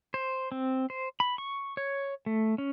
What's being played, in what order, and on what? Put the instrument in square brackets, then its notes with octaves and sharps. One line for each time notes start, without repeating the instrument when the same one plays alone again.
[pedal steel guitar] C5
C4
C5
B5
C#6
C#5
A3
C#4